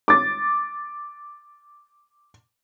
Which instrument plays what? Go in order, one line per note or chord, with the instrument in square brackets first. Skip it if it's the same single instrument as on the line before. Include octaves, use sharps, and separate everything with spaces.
[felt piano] D6 A6